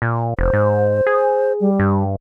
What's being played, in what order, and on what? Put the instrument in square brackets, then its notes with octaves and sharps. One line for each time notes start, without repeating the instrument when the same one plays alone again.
[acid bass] A#2
[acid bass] F1 [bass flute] C5
[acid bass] G#2
G#4
[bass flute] G3
[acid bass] G2